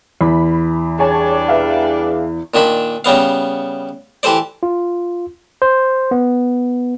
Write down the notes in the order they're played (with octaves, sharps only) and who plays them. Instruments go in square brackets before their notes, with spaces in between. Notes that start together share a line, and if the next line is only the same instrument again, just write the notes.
[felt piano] E2 [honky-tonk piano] B5
[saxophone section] G3 D4 [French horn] G#4 [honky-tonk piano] C#5 G#5 A5
[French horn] G#4 [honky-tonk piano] B4 E5 F5
[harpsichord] A#2 D#3 D4 B5
C#3 G3 B3 F5
E3 G4 A4 C5 D5
[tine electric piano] F4
C5
B3